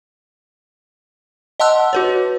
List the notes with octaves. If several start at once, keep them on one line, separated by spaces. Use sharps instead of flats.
D#5 F#5 A5 C6 E6 F#6
F#4 B4 C#5